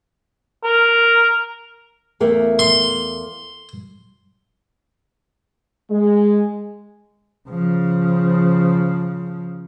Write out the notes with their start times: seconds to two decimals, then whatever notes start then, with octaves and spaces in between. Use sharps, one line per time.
0.64 A#4
2.20 E2 A3 A#3
2.59 C6
5.90 G#3
7.49 C#3 F3